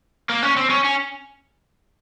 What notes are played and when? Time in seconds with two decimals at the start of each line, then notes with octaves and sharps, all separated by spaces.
0.29 A#3
0.43 C#4
0.56 C4
0.70 C#4
0.84 C#4